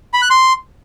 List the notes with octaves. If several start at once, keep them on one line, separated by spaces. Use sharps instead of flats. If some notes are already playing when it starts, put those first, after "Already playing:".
B5
F#6
C6